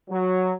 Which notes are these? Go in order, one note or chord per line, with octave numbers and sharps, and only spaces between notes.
F#3